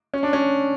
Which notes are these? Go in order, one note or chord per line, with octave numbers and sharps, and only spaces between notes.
C#4
D4
C#4